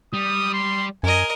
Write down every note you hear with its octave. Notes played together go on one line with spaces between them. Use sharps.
G3 D#6
C6
F#2 A#4 D#5 G#5